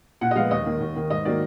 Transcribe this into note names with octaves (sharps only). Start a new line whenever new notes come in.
A#2 F#5
D#5
F3 G#3 B3 F5
D#2 D#5
D#3 A#3
D#2
D#3 A#3
G#2 D#5
D#3 F#3 A#3 D5